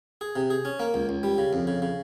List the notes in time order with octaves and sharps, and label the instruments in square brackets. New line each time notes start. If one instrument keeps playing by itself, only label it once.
[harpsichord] G#4
C3
G#4
C#4
A#3
C#2
C#2
G3
C#3
F2
C#3
C#3